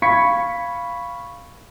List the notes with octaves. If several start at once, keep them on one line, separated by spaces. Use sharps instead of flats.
F5 B5 C#6 G#6 B6 C#7